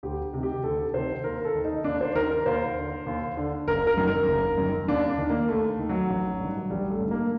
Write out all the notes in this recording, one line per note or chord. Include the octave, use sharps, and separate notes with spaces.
D2 G4
C3 D#3
G4
D2 A4
C3 D#3 C5
D#2 A#4
A4
D#3
D#4
D#2 D4
C5
D#3 A#4
A#4
D#2 C5
D3
D#2
D3
F#1 A#4
A#4
F#2 D#3
A#4
F#1
F#2 D#3
D#2 D4
D4
D#3
A#3
D#2 A3
D#3
F#3
A1
G2 D#3
A1 G3
A3
G2
D#3
A#3